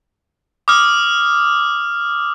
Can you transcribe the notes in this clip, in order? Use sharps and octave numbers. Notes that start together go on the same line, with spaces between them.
D6 D#6 F6